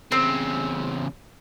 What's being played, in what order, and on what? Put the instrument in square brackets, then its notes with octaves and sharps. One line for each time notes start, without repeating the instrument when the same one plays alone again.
[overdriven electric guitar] E2 C#3 [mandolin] C4